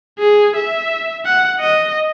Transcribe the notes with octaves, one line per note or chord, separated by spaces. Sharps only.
G#4
E5
F#5
D#5